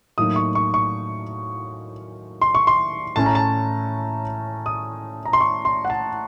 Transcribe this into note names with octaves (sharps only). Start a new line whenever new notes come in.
A2 F#3 A#3 D#4 D#6
C#6
C#6
C#6
C6
C#6
C6
A2 A3 C#4 A5
A#5
A5
D#6
A#5
C6
C#6
C6
F#5
A5